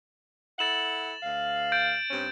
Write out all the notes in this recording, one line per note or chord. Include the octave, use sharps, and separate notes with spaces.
E4 A4 F#5 A6 E7 F#7
D2 F5
G6 A6 D7
G2 C4 C#4